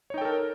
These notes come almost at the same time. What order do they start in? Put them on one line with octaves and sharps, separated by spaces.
C#5 D#4 G5 A4 A#4